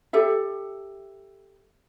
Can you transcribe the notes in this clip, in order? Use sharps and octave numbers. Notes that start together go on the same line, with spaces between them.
G4 A4 E5